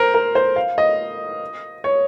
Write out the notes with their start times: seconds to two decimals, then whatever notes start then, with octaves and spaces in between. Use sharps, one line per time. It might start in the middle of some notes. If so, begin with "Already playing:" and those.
Already playing: A#4 C5
0.14 A#4
0.35 C5
0.56 F5
0.78 D#5
1.84 C#5